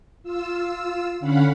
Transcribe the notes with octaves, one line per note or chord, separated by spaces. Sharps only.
F4 E6
D3 C#4 F5 F#5 B5